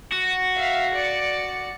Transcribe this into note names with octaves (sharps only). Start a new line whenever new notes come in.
F#4
E5 F5
D5 C#7